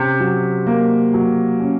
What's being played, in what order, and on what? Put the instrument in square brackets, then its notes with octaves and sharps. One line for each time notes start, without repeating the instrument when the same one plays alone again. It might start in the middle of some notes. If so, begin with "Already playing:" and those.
Already playing: [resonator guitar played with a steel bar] C3 [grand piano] C#4
[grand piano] F#3
A#3
F#3
C#4